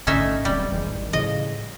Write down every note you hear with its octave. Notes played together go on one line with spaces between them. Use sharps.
A1 G#2 D3 C#4 D#4 E5
D1 B1 G3 C4
F1 E3 G#3
A1 D#3
A2 C#3 F3 D#5